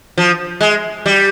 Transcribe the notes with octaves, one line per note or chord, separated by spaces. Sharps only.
F3
G#3
G3